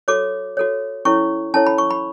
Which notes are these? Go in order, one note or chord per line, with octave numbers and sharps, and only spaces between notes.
F#4 A4 C#5 D6
F#4 A4 C#5
C#4 E4 A4 C#5 C#6
C#4 E4 A4 C#5 A5
B5
C#6
B5